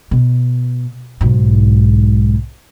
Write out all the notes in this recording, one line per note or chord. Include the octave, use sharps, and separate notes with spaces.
B2
B1 G#2